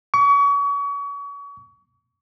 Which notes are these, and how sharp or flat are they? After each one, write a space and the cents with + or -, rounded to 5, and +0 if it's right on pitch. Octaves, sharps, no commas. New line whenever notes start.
C#6 +35